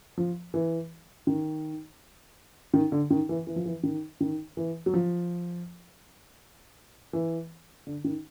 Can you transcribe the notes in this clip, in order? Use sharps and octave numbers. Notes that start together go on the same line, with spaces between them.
F3
E3
D#3
D#3
D3
D#3
E3
E3
F3
E3
D#3
D#3
E3
F#3
F3
E3
D3
D#3